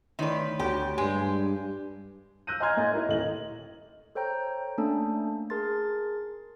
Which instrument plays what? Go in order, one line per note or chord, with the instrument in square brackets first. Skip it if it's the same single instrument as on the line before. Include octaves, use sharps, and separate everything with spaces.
[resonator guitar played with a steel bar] D#3 B4 [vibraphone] A3 C#5 C6 [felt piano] E4 D5
[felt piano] D2 F#4 [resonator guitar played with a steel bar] G4
[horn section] G2 [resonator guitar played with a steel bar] G#3 G4 [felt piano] G#5
[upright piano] E6 F#6 G6 A#6 D#7
D#5 G#5 A#5 C6 F6 G#6
A2 A#3 D#5 G#6 A6
D#4 E4 A#4 D#5
D#1 A2 D#5 F#7
[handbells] A4 C5 C#5 G5 A#5 G6
A3 A#3 C#4 D4 A4 A5
G#4 A#4 A5 C6 A6